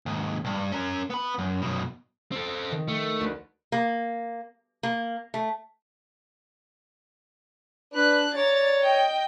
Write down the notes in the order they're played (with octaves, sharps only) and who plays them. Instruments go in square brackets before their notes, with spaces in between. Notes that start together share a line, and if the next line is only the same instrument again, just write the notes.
[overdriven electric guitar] D#2 G#2
B1 G2
C#4 A#4
B3 B5
F#2
F#2 B2
[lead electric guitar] C4 A4
[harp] D#3
[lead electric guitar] A3
[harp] D2 B4
[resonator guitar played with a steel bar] A#3
A#3
A3
[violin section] D4 F#6 [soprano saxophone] B4
[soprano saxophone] C#5 [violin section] D5 A#5 A6
[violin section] D#5 G5